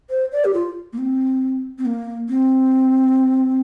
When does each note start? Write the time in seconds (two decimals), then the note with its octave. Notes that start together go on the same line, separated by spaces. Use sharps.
0.10 C5
0.32 D5
0.45 G4
0.54 F4
0.93 A#3
0.98 C4
1.78 C4
1.85 A#3
2.29 C4